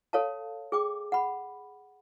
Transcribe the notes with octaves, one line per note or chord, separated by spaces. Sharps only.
A4 C#5 F5 A5
G#4 G5 D6
F#5 B5